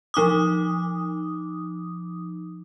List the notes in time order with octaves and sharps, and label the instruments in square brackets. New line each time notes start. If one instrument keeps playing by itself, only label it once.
[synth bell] F3 D#4 D6 D#6